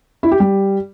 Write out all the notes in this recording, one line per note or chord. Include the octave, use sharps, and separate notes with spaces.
E4
G4
G3